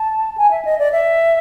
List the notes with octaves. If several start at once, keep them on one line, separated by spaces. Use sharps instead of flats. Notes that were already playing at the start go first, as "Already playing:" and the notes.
Already playing: A5
G#5
E5
D#5
D5
E5